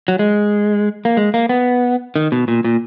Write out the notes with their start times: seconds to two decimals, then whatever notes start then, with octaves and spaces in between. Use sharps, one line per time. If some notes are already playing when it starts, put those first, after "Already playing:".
0.08 F#3
0.19 G#3
1.05 A#3
1.17 G#3
1.34 A#3
1.49 B3
2.16 D#3
2.32 B2
2.48 A#2
2.65 A#2